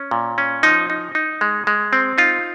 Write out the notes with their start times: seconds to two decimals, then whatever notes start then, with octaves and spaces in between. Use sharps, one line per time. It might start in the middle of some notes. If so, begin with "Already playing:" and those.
Already playing: C#4
0.11 A#2
0.38 C#4
0.63 F3 D#4
0.90 D#4
1.15 D#4
1.41 G#3
1.67 G#3
1.93 C4
2.18 D#4 F4